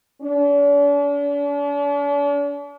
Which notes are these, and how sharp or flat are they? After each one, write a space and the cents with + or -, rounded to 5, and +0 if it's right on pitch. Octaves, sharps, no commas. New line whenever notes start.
D4 -45